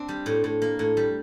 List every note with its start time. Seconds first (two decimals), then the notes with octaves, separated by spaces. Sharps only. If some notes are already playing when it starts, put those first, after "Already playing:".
Already playing: C4 D4
0.08 G3
0.26 A2
0.44 A2
0.62 A#3
0.79 A2
0.97 G3